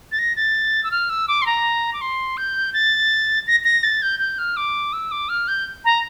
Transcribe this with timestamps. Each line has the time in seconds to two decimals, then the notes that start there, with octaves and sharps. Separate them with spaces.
0.12 A6
0.19 A#6
0.36 A6
0.84 E6
0.91 F6
1.10 E6
1.28 D6
1.42 C6
1.46 A#5
1.93 D6
2.01 C6
2.37 G6
2.74 A6
3.47 A#6
3.64 A#6
3.83 A6
4.02 G6
4.20 G6
4.38 F6
4.57 D6
4.93 E6
5.12 D6
5.29 F6
5.48 G6
5.85 A#5